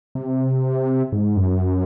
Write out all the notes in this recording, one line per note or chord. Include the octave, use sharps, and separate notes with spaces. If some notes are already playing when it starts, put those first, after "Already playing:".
C3
G#2
F#2